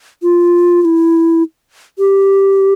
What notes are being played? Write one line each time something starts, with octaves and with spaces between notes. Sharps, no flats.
F4
F4
E4
G4